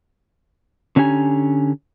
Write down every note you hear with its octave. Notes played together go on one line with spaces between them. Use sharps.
D3 C#4 D4 G4 G#5 A#5